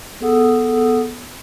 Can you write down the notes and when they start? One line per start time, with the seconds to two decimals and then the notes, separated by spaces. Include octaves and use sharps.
0.21 B3 G#4 A4 F#5 D#6 E6